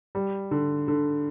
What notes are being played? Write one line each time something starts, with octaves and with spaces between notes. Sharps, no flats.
G3
D3
D3